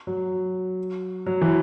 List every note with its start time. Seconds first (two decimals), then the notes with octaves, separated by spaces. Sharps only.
0.07 F#3
1.26 F#3
1.41 E3